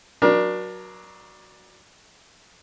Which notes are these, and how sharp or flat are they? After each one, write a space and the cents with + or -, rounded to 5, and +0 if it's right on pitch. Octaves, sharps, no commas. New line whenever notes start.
F#3 +0 D4 +15 A#4 +35